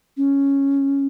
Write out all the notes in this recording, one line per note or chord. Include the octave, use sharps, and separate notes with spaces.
C#4